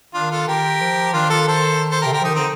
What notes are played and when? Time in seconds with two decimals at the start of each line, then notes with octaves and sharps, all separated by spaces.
0.14 D#3 D4 F4
0.31 F4 A4
0.48 D#3 G4 A#4
0.81 F3
1.13 D#3 D4 F4
1.30 F4 A4
1.48 A4 C5
1.91 A4 C5
2.02 G4 A#4
2.06 C3
2.13 D3 G4 A#4
2.21 F3
2.24 D#4 G4
2.29 D#3
2.35 D3 C4 D#4